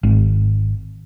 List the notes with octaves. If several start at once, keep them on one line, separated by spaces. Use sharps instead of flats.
G#1